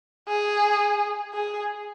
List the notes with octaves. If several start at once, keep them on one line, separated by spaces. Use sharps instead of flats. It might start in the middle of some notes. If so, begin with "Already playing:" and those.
G#4
G#4